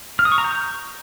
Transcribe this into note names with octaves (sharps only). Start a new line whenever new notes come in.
F6
D#6
C#6
A#5
G6